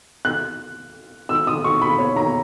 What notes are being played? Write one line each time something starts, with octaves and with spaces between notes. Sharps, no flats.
F#6
E6
D#6
C#6
B5
C#5
A#5